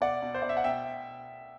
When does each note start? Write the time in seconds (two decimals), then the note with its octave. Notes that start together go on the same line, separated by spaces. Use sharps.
0.01 B2 D5 F#5
0.22 B2
0.34 C5
0.42 B2 D5
0.49 E5
0.57 F#5
0.64 B2 E5 G5